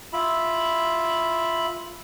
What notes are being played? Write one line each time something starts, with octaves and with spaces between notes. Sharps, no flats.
F4 E5 B5